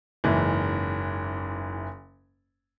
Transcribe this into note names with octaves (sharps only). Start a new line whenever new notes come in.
F#1 G#2 E3